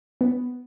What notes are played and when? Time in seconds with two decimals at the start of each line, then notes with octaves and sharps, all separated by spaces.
0.21 B3